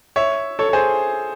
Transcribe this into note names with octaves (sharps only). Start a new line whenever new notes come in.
C#5 E5
A4 C#5
A4
G#4 C5